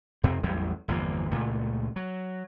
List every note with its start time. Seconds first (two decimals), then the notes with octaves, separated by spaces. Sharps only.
0.23 F2 C3 C4
0.43 A1 E2 F#3 G3
0.88 G1 E2 F3 A#3
1.31 C#2 A#2 A3
1.96 F#3